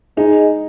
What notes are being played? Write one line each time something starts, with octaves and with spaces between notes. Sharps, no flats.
G#3 D#4